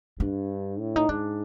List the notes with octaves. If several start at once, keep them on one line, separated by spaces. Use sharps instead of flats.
G2 D4
A2
D#4
G#2 D4